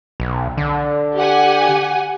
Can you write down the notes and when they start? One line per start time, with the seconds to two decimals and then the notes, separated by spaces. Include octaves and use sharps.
0.20 B1
0.57 D3
1.16 G4 F#5 G#5